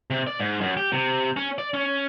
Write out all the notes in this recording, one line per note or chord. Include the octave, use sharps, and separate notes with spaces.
C3
D5
G#2
F#2
G4
C3
C#4
D5
C#4